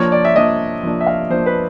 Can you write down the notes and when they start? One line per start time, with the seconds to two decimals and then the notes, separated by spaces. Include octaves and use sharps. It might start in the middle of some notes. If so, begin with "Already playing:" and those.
Already playing: F3 A#3 D4 C#5
0.12 D5
0.25 E5
0.36 F3 A#3 D4 D#5
0.83 F3 A#3 D4
1.00 E5
1.07 F5
1.30 F3 A#3 D4 C5
1.46 B4